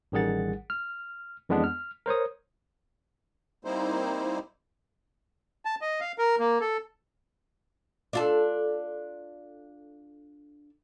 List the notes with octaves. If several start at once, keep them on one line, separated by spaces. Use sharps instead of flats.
A1 D#3 G3 G#4 F#5 A6
F6
F2 E3 G#3 B3 D4
F6
A#4 C5 C#5 D#6
G3 A#3 C4 D#4 E4 C5
A5
D#5
F5
A#4
A#3
A4
D4 F4 A4